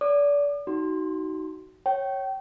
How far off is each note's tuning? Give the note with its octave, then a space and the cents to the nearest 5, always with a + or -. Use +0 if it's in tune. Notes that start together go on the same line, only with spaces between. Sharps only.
D5 -30 D6 +45
D#4 +15 F#4 +25 C6 +0
C#5 -10 G5 -30